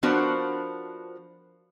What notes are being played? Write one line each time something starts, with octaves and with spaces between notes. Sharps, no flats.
F3 B3 D4 F#4 A#4 C5